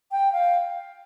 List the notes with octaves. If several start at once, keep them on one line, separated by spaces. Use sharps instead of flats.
G5
F5